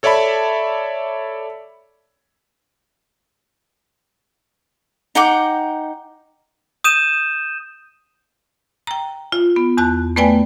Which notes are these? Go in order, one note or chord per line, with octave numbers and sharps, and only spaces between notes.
A4 C#5 D5 E5 A5 B5
D#4 F#5 G5 D6
D#6 G6 D#7 E7
G5 A#5
F4
B3
E2 A5 F#6
A3 B3 B4 D5 G5 G#5